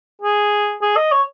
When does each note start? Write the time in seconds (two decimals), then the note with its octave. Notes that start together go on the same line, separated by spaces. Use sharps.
0.22 G#4
0.82 G#4
0.97 D#5
1.12 C#5